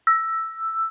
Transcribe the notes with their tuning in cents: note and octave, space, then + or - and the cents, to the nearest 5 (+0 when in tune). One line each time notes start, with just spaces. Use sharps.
E6 +5